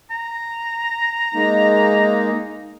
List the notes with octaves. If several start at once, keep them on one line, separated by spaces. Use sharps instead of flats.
A#5
G#3 A#3 D#4